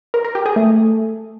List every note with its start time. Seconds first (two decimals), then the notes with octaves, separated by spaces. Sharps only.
0.14 A#4
0.24 A#4
0.35 G4
0.46 G#4
0.56 A3